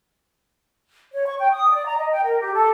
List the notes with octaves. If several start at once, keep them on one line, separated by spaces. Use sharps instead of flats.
C#5
C#6
G5
D#6
D5
A#5
D#5
G5
A#4
G4
A4